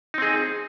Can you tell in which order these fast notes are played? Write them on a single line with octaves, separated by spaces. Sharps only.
D#4 C4 G#4